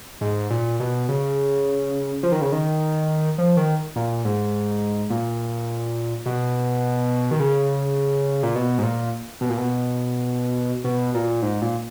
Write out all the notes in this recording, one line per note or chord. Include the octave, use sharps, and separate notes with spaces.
G#2
A#2
B2
C#3
F3
D#3
C#3
D#3
F3
D#3
A#2
G#2
A#2
B2
D#3
C#3
A#2
B2
G#2
A#2
B2
A#2
B2
B2
A#2
G#2
A#2